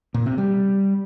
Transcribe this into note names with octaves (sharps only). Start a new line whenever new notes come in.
A#2
C3
G3